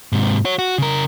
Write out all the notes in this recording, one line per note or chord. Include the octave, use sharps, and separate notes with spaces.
G#2 C3
F#4 C#5
F#4
C#3 A#4